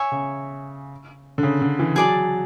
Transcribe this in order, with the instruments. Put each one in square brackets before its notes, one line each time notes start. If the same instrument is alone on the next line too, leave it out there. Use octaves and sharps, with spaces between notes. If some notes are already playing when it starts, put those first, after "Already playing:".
Already playing: [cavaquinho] C#5 E5 G#5
[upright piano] C#3
D3
C#3
D3
E3
[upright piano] F#3 [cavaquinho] G#4 D5 A5